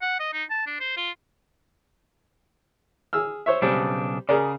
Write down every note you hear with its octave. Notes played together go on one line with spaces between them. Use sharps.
F#5
D#5
D#4
A5
D4
C5
F4
G#4 E6 F6
C5 C#5 E5
B1 C#3 G3 C4 D4
C#3 G#4 A#4 D5